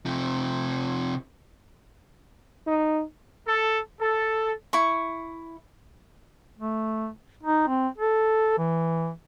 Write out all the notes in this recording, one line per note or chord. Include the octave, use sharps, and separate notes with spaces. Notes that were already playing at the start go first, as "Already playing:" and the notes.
C3 F3
D#4
A4
A4
E4 C#6
A3
D#4
C4
A4
E3